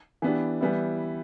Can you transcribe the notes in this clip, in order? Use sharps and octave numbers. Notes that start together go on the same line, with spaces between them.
E3 B3 D4 G4
E3 G3 B3 E4